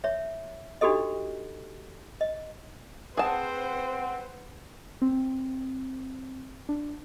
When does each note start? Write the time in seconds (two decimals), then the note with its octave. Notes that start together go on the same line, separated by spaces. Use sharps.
0.04 C#5 E5
0.81 D4 D#4 F#4 G4 A4 D#5
2.21 D#5
3.17 C4 G#4 B4 C5 F#5 A5
5.02 C4
6.69 D4